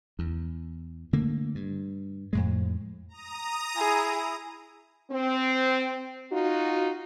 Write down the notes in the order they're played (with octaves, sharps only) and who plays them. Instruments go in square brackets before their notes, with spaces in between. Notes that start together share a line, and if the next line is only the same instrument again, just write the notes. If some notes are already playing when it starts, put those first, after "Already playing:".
[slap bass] E2
D3 A3 A#3
G2
F2 A2 G#3
[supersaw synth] A#5 D#6
[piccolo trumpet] E4 [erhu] G#4
[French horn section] C4
D#4 F4 F#4